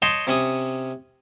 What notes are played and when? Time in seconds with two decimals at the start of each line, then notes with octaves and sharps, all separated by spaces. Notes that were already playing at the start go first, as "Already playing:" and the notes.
0.02 C#5 D#5 G5 A5 C6
0.27 C3 C#4 D#6